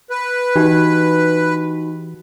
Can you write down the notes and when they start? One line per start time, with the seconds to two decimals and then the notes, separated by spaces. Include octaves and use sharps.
0.10 B4
0.56 E3 D#4 F#4 G4